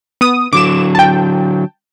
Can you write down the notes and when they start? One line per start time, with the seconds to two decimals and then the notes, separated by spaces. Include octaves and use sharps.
0.21 B3 D#6
0.53 D3 F#3 D6 E7
0.95 G5 A5